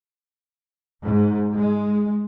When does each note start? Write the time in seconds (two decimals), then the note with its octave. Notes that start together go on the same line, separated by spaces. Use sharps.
1.03 G#2
1.56 G#3